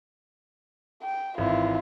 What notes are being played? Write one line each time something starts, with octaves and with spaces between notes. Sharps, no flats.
G5
G#1 E3 E4 F4